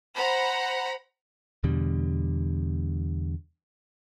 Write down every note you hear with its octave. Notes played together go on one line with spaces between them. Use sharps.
C5 F#5 A#5 B5
E2 B2 D3 G3